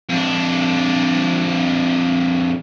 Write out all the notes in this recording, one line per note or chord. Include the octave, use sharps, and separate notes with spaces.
F2 D4